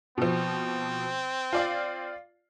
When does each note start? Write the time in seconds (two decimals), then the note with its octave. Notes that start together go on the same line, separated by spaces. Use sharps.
0.18 B2 F3 C4
1.53 F4 D5 F5